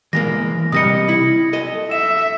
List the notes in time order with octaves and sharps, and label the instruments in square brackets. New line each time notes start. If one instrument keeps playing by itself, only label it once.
[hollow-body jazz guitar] E3 G#3 A#3 [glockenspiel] A#6
[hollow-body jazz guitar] C3 G3 D#5 [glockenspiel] D#6 A#6 C#7
[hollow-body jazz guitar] E4
A4 D#5
[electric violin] E5 [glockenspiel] E7